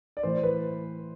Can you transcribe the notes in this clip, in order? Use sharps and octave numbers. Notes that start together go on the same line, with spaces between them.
D5
A2 E3 C5
B4